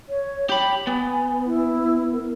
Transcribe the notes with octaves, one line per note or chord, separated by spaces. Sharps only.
C#5
G4 G5 B5
B3 G#5
E4
A#4